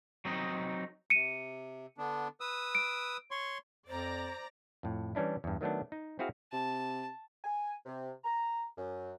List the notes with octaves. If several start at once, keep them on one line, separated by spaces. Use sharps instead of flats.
F#3 C4 D#4 D#5
C3 C#7 D#7
D3 B3 D4
B4 D#6 E6
D7
C#5 C6 C#6
F2 C5 D5 A#5
F2 A2
E3 G3 C#4 D4 E4
E2 G2
D#3 F#3 A3 B3 D4
D#4
C4 E4 F#4 G#4 F5
C3 A5
G#5
C3
A#5
F#2